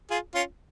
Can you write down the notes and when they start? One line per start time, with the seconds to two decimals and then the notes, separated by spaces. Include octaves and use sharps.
0.10 F4 G#4
0.35 C#4 F4